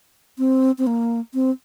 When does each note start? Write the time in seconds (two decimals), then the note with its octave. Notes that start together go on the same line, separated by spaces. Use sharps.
0.38 C4
0.78 C4
0.87 A#3
1.34 C4